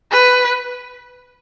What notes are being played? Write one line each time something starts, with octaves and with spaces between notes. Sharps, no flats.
B4